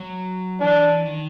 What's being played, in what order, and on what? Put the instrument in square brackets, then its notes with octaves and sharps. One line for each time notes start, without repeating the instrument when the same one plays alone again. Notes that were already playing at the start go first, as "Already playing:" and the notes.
Already playing: [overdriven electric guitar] F#3
[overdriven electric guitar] E3 [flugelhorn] D4
[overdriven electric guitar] D#3